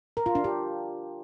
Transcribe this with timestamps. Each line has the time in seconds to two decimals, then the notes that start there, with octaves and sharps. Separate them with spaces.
0.17 A#4
0.26 F4
0.35 D4
0.44 G4